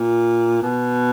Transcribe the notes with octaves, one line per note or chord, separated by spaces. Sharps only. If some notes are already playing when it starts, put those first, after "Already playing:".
Already playing: A#2
B2